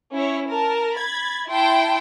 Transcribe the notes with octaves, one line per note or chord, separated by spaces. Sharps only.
C#4 E4 C#5
A#4 A5
B5 G#6 A6
E4 G5 A5 C6